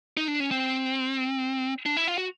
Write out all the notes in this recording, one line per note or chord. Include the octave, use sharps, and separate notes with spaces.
D#4
D4
C#4
C4
D4
E4
F4
F#4